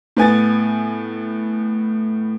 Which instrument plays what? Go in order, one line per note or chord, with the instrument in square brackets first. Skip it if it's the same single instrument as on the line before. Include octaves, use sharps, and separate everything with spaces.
[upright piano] A2 B3 G#5 A6